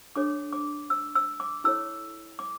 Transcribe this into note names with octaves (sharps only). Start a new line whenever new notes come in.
D4 A4 C#5 D6
D6
E6
E6
D6
E4 A4 C#5 E6
D6